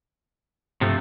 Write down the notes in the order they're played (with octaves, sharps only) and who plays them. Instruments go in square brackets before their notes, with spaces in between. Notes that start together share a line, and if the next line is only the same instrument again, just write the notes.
[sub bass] G2 [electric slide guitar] C3 F3 A3